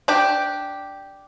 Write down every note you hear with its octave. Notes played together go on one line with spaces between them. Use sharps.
D4 G4